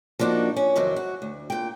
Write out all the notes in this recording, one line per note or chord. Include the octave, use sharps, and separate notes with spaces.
F3 A#3 D4 D#4 F#4
C#4
F2 C3 D#3 F#3
F#4
D2
A#2 G5